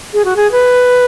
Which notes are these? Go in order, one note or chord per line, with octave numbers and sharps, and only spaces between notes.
G#4
F#4
G#4
B4